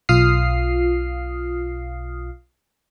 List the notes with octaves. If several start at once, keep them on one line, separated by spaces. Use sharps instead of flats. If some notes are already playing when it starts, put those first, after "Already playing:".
B1 F4 F5 D#6 F6 C7